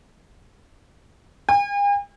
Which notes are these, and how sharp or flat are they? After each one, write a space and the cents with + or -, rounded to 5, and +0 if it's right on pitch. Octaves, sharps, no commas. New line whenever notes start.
G#5 -45